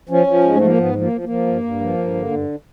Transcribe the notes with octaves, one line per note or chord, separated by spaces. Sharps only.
F3 C#4
F3
G#2 G#3
A3
F3
A#3
G#2 B3
F3
A#3
F3
A#3
F3
G2
G2
F3
G2
D3
G2